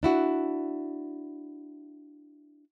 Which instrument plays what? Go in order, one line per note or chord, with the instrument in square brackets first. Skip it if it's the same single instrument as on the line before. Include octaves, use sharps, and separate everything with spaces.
[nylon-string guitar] D4 E4 F#4